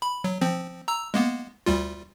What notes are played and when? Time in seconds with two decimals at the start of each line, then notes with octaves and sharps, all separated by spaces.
0.02 B5
0.24 F#3
0.41 F3 C4
0.88 A#5 E6
1.14 G#3 A#3 B3
1.66 D2 G3 F4